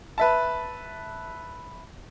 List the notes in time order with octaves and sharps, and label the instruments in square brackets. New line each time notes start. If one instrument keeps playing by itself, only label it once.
[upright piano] B4 E5 A5